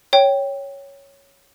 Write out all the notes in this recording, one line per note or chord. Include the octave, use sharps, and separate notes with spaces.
C#5 G5